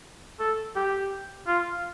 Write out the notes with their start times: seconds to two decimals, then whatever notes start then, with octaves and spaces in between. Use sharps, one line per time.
0.40 A4
0.76 G4
1.47 F4